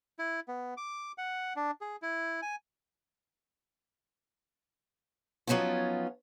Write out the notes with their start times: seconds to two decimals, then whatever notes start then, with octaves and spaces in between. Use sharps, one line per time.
0.19 E4
0.48 B3
0.77 D6
1.18 F#5
1.56 D4
1.81 G#4
2.02 E4
2.42 G#5
5.47 F3 F#3 B3 C#4 D#4 F4